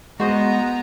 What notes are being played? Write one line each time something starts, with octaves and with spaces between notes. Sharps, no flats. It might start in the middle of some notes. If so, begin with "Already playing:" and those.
G#3 B3 F#4 C5 D#5 A#5